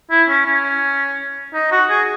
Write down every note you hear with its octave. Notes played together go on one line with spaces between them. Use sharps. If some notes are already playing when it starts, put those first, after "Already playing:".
E4
C#4
C#4
D#4
F#4
G#4